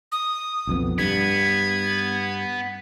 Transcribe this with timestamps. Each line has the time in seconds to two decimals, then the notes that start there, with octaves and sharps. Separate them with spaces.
0.12 D#6
0.67 B1 F2 B3
0.99 G2 B3 G#6